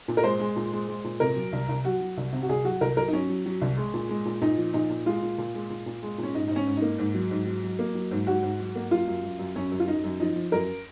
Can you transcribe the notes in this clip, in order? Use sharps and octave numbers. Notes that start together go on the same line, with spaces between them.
A#2
A#4
G#3 C5
G#3
A#2
G#3
G#3
A#2
C3 A#4
F#3
C2
C2
F#3 F#4
F#3
C2
C3
F#4
C2 G#4
F#3 F#4
C2 A#4
F#3 A#4
D#4
F#3 C#4
F#3
F#3
C2
G#3
A#2
G#3
A#2
A#2 D#4
F3
A#2 D#4
A#2
G#3 F4
A#2
A#2
G#3
A#2
A#2
G#3
A#2
C#4
G#2 D#4
G#2 D#4
C#4
G#2
A#3 D#4
G#2
F#3
G#2
F#3
F#3
A#3
F#3
G#2
G#2 F#4
G#2
F#3
A#3
F#2 F4
F#2
F#2
F#2
F#2 C#4
F#2
F4
F#2 D#4
F#2
F3 D#4
F3
F#2 A#4